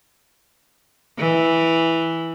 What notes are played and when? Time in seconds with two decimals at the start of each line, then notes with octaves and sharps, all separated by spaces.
1.18 E3